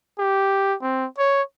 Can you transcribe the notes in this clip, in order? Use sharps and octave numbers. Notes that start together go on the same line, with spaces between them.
G4
C4
C#5